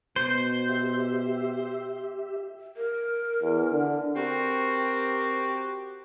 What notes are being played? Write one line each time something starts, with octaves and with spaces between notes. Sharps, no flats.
B2 C5
G4 E5
A#4
E2
D3
C4 F#4 G4 A#4